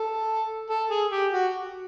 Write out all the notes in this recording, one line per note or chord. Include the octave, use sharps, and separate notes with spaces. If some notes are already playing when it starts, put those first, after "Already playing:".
Already playing: A4
A4
G#4
G4
F#4